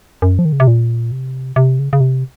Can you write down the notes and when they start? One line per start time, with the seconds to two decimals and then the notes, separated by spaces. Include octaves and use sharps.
0.22 F#2
0.39 F3
0.45 D#3
0.52 C#3
0.60 C3
0.67 A#2
1.12 C3
1.56 C3
1.79 C#3
1.93 C#3
2.00 C3